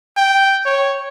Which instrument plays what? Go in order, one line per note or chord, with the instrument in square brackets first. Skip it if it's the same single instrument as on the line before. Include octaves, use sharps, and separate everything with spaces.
[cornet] G5
C#5